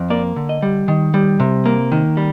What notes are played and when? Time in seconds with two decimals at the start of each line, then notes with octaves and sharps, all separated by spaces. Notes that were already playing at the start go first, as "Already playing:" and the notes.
Already playing: F2
0.10 A#3 D5
0.36 D3
0.49 D#5
0.62 G3
0.88 D#3
1.14 G3
1.40 C3
1.66 A#3
1.92 D#3
2.17 G3